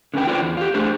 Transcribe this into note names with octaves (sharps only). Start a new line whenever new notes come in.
D3 C#4 B4 G5
D4 F4 C5 D5 G5
E2
F4 G4
A3 D4 G#4 C5